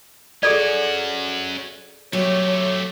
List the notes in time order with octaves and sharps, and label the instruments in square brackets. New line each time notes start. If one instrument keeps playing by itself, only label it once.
[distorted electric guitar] C#4 F#4 [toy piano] G#4 A4 D5
[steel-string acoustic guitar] F#3 [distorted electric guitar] A3 G4 [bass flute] C#5